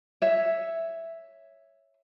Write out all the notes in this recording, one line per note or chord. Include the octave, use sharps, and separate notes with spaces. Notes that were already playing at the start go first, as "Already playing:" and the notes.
C#5 E5